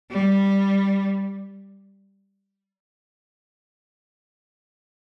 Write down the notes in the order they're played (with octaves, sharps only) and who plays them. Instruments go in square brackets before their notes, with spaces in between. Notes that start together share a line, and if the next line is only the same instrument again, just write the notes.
[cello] G3